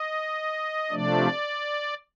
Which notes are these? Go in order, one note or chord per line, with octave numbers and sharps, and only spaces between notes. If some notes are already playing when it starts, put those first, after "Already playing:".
Already playing: D#5
C3 F3 A3 D4 D5